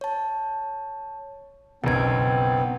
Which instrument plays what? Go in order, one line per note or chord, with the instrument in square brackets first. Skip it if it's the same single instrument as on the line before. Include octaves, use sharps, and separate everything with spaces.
[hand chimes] C#5 A5
[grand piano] F#1 B1 [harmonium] B3 C4 [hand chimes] G5 G#6